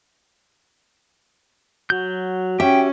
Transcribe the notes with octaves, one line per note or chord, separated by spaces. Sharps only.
F#3 F#4 G6
C#4 G4 E5 G5